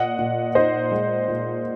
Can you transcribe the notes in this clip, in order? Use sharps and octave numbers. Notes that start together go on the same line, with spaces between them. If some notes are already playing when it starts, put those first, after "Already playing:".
Already playing: A#2 D#5 F#5
A#2
D#4 C5 D#5
G#3
A#2